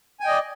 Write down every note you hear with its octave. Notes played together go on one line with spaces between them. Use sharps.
D5 D#5 G5 G#5